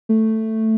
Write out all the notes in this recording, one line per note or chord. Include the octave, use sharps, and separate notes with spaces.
A3